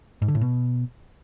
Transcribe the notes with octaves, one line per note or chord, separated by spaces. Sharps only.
G#2
D3
A2
B2